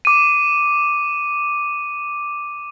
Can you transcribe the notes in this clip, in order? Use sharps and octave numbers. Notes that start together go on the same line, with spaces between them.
D6 D#7